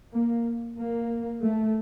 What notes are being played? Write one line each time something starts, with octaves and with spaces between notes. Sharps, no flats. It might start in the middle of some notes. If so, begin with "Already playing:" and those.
A#3
A#3
A3